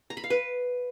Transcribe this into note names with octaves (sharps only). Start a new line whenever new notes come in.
A#5
B5
F5
B4